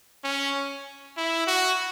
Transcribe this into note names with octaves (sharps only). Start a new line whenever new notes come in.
C#4
E4
F#4